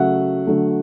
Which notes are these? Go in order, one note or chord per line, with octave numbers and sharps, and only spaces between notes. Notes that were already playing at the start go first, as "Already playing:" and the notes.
Already playing: C#3 F#3 A3 E5 F#5
D3 F#3 A3